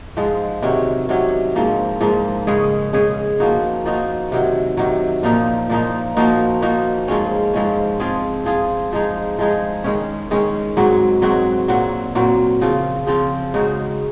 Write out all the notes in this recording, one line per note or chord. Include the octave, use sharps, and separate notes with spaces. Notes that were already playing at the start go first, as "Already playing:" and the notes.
G#2 F3 G#3
C3 D#3 F#3 C#4
C3 D#3 F#3 C#4
G#2 F3 A#3
G#2 F3 A#3
C#3 G#3 C#4 G#4
C#3 G#3 C#4 G#4
F3 A#3 D#4 F#4
F3 A#3 D#4 F#4
C3 D#3 F#3
C3 D#3 F#3
A#2 F3 A#3 D#4
A#2 F3 A#3 D#4
F3 A#3 D#4 F#4
F3 A#3 D#4 F#4
G#2 F3 G#3 C#4
G#2 F3 G#3 C#4
F3 C4 F4 G#4
F3 C4 F4 G#4
F3 G#3 D#4 G#4
F3 G#3 D#4 G#4
D#3 G#3 C#4
D#3 G#3 C#4
G#2 F#3 C4 F#4
G#2 F#3 C4 F#4
A#2 F#3 C4 F#4
A#2 F#3 C4 F#4
C#3 F3 C4 F4
C#3 F3 C4 F4
C#3 G#3 D#4 F#4